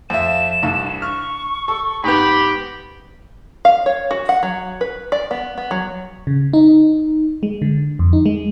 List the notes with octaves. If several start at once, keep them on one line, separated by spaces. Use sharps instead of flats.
F2 F4 E5 E7
C2 G2
C#6 F6
A4
G#2 B3 G4 B5
F5
C#5
F#4
F#5
F#3
B4
D5
B3
B3
F#3
C#3
D#4
G#3
D3
F2
D#4
G#3